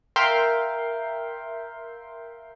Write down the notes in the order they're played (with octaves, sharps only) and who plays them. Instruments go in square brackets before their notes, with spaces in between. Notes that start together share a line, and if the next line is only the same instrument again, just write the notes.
[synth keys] A#4 E5 F5 G5 C6